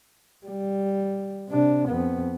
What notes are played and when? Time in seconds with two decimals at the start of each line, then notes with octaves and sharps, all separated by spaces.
0.46 G3
1.49 C3 D4
1.88 F2 B3